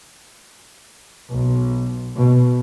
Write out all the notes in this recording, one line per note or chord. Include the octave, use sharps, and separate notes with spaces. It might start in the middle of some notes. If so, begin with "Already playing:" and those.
B1
B2